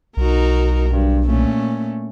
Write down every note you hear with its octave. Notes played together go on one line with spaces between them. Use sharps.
B1 D#4 F#4 A#4
G2
A#2 A3 C#4